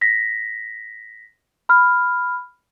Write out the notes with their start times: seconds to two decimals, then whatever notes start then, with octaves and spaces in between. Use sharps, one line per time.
0.01 A#6 B6
1.69 B5 F6